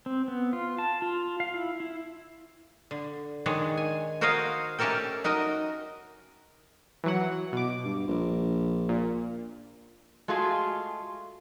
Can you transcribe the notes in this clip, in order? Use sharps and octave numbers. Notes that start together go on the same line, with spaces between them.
C4
B3
F4
A5
F4
F5
E4
E4
D3
D#3 G#3 D4 C#5
G#5
F#4 A#4 C5 C#5 D#5 F5
A3 C#4 G4 A4 A#4 G5
D#4 F#4 A#4 D#5
E3 F#3 F#5
B2 D6
G2
A#1
A#2
G#3 A3 F4 F#4 G#4